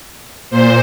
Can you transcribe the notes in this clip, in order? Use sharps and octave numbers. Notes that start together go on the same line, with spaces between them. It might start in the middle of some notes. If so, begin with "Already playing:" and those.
A#2 C5